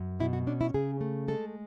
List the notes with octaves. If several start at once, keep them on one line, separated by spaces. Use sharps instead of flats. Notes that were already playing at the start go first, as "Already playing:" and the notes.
Already playing: F#2
B2 E4
F#4
C#4 D4
E4
C#3 G#4
A3
G#3 A4